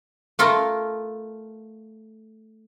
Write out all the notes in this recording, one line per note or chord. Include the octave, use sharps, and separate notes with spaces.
A3 F4 A4 A#4